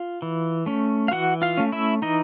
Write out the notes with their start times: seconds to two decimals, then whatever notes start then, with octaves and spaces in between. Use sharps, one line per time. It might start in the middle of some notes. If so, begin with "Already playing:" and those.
Already playing: F4 F5
0.22 E3
0.66 A3 C#4
1.08 F5
1.11 E3 F#4 F#5
1.42 F4 F5
1.57 A3 C#4
1.72 E4 E5
2.02 E3 D#4 D#5